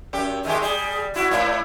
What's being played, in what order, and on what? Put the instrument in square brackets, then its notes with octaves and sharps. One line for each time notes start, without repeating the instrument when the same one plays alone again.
[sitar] F#2 G4
[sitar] D#3 G#3 G4 [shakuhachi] E5
[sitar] G3 [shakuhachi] G#4
[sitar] E4 [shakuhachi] F#4
[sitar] G#2 E4 [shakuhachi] F5